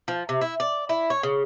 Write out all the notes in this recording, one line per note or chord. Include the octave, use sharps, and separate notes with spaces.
F3
C3
E4
D5
E4
C#5
C#3